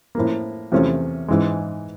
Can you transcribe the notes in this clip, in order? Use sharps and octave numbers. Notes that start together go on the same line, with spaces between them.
A2 F3 A#3
E2 C3 F3 A3 C#4
G#2 E3 G#3